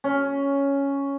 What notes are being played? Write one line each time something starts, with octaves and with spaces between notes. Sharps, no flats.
C#4